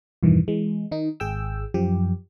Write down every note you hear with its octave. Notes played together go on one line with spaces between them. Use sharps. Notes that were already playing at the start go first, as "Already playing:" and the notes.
E2 G2 B2 D#3 E3
E3 G#3
D#3 D#4
G#1 G#4 G5 E6
F#2 F3 G4